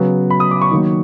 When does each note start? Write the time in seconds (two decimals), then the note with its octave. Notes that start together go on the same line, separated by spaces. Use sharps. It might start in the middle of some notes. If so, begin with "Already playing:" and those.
Already playing: C#3 F#3 B3
0.30 B5
0.40 D#6
0.51 D6
0.62 C#6
0.72 D#3 F#3 A#3